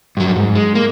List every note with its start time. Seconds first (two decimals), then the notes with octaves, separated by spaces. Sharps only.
0.17 G2 F#3
0.36 G#2
0.55 G#3
0.75 A#3